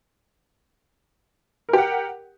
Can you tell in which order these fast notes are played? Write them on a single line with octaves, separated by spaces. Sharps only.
A#4 G4 F#5